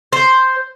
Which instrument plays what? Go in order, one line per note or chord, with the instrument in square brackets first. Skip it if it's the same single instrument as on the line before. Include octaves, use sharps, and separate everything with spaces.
[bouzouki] C5